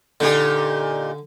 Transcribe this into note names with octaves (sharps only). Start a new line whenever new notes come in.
A#2 D3 D#4 G4